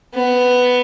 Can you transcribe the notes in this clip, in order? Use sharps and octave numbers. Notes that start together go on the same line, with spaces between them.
B3